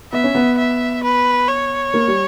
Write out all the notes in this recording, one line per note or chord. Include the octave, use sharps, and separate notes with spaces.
B3 E5
C#4
B3
E5
B4
C#5
A#3
G3